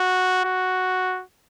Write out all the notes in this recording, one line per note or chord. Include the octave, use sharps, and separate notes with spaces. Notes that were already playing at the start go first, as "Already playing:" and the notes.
Already playing: F#4
F#4